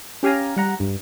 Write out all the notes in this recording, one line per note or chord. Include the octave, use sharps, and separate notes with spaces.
C#4 G4 F5 G#5 A#5
G3 F#5 A#5
G2